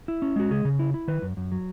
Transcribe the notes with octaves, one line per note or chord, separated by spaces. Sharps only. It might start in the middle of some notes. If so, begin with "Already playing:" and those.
E4
C#4
G#3 F#4
C#3 G#4
C#3
E4
E4
D#3 B4
F#2
F#2
F#3